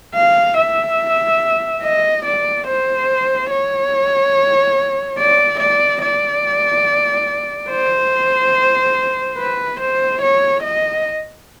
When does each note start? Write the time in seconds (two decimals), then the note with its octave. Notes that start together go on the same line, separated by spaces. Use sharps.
0.15 F5
0.58 E5
1.83 D#5
2.25 D5
2.67 C5
3.50 C#5
5.19 D5
5.60 D5
6.02 D5
7.70 C5
9.38 B4
9.80 C5
10.22 C#5
10.63 D#5